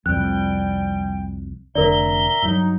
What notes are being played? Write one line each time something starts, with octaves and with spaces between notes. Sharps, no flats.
C2 F2 G3 G5 F#6
F1 D3 A#4 D5 E5 A#5 G7
G2 F#3 D#4